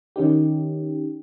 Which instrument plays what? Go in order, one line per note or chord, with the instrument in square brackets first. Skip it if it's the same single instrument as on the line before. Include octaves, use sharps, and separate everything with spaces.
[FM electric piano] D#3 C#4 D#4 G4